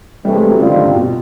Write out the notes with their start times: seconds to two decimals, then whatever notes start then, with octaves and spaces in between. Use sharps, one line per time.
0.25 C3 E3 G3 A3
0.33 G#3
0.42 G3
0.51 F#3
0.59 C#3 G3 C4 F4
0.69 D#3
0.77 D3
0.86 C3
0.95 B2